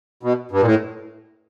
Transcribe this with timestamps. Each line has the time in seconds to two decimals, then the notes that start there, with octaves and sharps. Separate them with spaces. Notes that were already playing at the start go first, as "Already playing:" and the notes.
0.23 B2
0.51 G2
0.61 A#2
0.65 A2